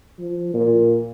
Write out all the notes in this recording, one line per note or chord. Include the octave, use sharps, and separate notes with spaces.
F3
A#2